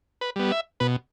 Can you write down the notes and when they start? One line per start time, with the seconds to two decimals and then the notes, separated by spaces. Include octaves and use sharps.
0.21 B4
0.36 G3 B3
0.52 E5
0.80 B2 B4